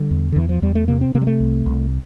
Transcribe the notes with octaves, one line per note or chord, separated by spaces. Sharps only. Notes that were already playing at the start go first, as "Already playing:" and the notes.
Already playing: D3 G3
E2
D3
E2 E3
F3
E2 G3
A3
C3 A#3
C4
C3 A#3
G3
A3
C2
C2